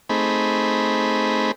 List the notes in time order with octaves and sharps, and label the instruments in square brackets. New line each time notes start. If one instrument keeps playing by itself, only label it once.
[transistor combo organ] A3 C4 D#4 G#4 B5